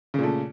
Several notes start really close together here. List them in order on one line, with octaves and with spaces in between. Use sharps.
C#3 A#2 A3